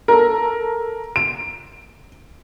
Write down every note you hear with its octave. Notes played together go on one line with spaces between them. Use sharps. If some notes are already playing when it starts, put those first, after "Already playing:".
A4 A#4
D7